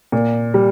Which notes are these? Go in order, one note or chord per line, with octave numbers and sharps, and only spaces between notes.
A#2
G3